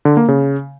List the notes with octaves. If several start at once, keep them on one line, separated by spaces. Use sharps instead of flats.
D3
A#3
C#3